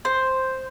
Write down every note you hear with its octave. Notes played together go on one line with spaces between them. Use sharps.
C5